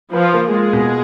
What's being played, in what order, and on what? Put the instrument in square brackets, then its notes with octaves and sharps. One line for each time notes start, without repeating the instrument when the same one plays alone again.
[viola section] F3 F4 [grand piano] B4
[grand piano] A#3
[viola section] G#3 G#4 [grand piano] F4
[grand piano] B2